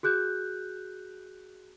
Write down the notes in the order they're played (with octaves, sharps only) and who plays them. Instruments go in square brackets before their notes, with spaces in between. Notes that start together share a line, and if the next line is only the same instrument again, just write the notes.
[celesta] F#4 G#4 F#6 G6